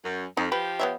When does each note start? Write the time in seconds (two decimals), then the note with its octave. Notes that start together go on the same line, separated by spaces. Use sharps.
0.05 F#2
0.37 F2 D#4
0.52 F3 G4 B4
0.79 B3 C#5 E5